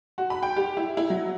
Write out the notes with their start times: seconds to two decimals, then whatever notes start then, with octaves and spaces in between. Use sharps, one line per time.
0.18 F#4
0.30 B5
0.43 G5
0.56 G4
0.77 E4
0.97 E4
1.10 F#3